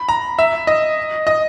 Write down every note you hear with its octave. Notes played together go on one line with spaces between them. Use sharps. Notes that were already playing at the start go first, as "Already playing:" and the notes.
Already playing: B5
A#5
E5
D#5
D#5